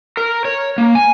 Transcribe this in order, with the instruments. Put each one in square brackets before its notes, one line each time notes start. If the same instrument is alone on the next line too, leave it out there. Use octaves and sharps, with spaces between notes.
[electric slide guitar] A#4
C#5
A#3
G#5